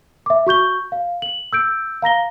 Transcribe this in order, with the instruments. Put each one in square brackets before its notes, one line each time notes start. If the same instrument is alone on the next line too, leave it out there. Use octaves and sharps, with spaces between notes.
[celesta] E5 D6
F#4 C#6 G6 G7
F5
F#7
E6 G6 D7
F5 A#5 A#6 G7